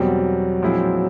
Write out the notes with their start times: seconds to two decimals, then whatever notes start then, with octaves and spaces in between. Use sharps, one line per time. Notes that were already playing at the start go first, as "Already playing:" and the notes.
Already playing: E2 B2 F#3 G3 C4
0.62 A#2 F3 G#3 C4 E4